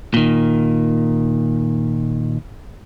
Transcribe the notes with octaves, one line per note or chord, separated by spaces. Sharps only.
A#2 D#3